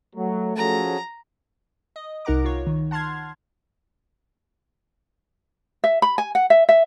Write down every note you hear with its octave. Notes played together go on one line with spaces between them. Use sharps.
F#3 A3
F3 F#3 C#4 F#4 G#4 A4 A#5
D#5
C2 D#4 A#4 F#5 A#5 D6
F4 C#5
D#3
F#5 A5 C6 F6 G#6
E5
B5
G#5
F#5
E5
E5